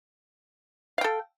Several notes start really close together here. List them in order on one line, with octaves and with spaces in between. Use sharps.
F5 G5 A4